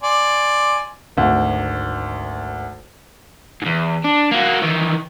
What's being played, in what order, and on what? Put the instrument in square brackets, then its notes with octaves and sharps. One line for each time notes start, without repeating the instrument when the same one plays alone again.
[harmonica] D5 G#5 C6
[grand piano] G#1 D2
[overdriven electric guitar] E2 G#2
D4
A#3 F#4
D#3 E3